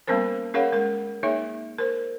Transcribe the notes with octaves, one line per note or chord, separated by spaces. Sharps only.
G3 A#3 B3 C#4 A#4 C5
C#4 G#4 A#4 C#5 F5 F#5
G#3 A#4
A#3 D#4 G#4 C#5 E5
A#4 C5